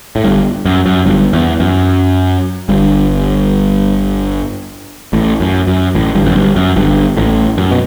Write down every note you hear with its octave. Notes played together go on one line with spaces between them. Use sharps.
A2
G1 G2
F#2
F#2
G1 G2
E2
F#2
G1 G2
A1 A2
F#2
F#2
A1 A2
G1 G2
F#2
G1 G2
F#2
G1 G2
A1 A2
F#2
B2